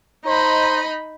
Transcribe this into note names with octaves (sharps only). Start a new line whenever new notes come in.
D#4 C5 D#5 A#5 B5